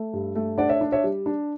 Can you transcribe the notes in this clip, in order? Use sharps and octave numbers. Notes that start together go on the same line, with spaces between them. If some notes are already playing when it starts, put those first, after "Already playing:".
Already playing: A3
G2
A3
D4 D5 F#5
C#5 E5
D4
C#5 E5
G3
D4